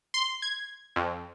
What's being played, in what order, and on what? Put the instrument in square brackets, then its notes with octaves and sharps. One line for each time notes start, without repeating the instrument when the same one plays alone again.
[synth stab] C6
G#6
F2